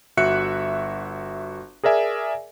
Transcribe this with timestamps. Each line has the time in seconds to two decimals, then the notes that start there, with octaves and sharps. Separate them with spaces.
0.17 G1 F#4 E5 F#6 C#7
1.84 G#4 A#4 D5 E5 G#5